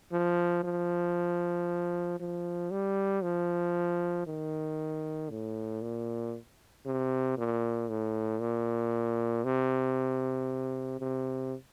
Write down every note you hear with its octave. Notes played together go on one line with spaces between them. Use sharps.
F3
F3
F3
G3
F3
D#3
A2
A#2
C3
A#2
A2
A#2
C3
C3